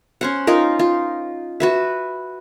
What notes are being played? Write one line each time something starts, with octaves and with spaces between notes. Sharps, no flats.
C#4 C5 F#5
D#4 F4 A#4
F4
F#4 B4 E5